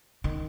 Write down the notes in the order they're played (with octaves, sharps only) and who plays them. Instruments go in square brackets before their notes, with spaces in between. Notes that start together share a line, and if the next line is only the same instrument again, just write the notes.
[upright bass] D#3